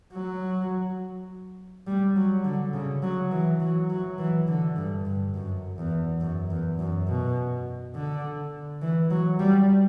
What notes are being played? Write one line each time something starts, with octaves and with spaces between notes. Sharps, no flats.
F#3
G3
F#3
D3
C#3
F#3
E3
F#3
F#3
E3
D3
G2
G2
F#2
E2
F#2
E2
F#2
B2
D3
E3
F#3
G3